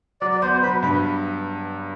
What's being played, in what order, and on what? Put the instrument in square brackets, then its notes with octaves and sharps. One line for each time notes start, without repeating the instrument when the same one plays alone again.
[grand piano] F#3 [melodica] D5
[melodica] D5
[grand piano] B3 [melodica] C5
[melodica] C5
[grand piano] F#3 [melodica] B4
[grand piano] G2 [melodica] B4